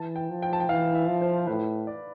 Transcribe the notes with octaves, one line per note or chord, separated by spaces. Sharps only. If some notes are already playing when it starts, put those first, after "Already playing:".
Already playing: E3 A5
G5
F3
G5
A5
G5
E3 F5
E5
F3
C5
A2 B4
D5